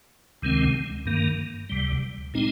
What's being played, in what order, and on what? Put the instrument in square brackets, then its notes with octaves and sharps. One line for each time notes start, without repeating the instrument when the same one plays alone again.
[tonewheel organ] D2 C3 D#3 G#3 C4
G2 D#3 A#3
D2 C3 G3
A#2 G#3 C4 D#4